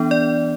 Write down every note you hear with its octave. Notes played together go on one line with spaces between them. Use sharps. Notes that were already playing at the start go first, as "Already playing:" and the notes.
Already playing: E3 B3 D4
D5